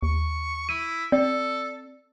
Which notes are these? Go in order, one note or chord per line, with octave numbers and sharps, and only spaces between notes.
D#2 C#6
E4 D#7
C4 A4 D5